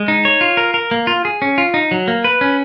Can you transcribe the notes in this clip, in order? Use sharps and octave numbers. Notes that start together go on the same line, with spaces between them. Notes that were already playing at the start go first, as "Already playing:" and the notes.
Already playing: G#3
D#4
C#5
F4
A#4
A#4
A#3
F4
G#4
C#4
F4
D#4
F#3
A#3
B4
C#4